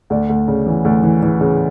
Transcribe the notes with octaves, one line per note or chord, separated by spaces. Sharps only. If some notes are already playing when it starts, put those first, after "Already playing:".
D2 D5
D2
C#3
E3
D2
E3
E3
C#3